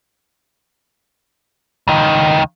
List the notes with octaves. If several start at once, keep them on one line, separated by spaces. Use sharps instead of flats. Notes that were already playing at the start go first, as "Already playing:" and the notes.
C#2 D#3